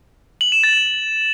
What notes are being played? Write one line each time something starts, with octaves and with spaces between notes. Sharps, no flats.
F#7
E7
A6